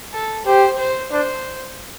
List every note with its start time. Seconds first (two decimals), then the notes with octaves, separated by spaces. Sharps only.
0.13 A4
0.46 G4 C5
0.78 C5
1.11 D4 C5